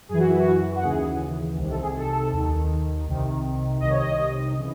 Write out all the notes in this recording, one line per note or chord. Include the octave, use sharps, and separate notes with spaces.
F#2 E3 G#4
F#4
E4
F#4
F#4
D#2 C#3 E3 G#4
C2 C3 D#3
A4
G#4
A4
D#2 D#3
C2 C3 D#3
C2 C3 D#3 D#5
C#5
D#5
C#3 E3